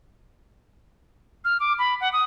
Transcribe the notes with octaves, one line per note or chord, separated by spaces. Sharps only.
F6
D6
B5
F#5
D#6